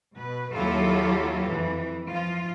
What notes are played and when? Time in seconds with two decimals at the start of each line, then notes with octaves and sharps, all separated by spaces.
0.16 B2 B4
0.53 D#2 F#3 E4 F4 G4 A4
1.48 F2 E3
2.09 F3 F4